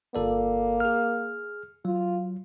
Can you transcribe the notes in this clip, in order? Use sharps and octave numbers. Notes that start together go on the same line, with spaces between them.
G1 A#3 A4 D5
G#4 F6
F#3 F4